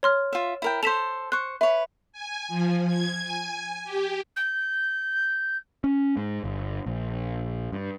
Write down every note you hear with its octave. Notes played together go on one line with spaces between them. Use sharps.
C#5 C6 F6
F4 E5
E4 A#4 G5
A4 C5 B6 E7 F7
C5 C#6 F#6
B4 C#5 E5
G#5
F3
G#6
G#5
G4
G6
C#4
G#2
G1
A#1
G2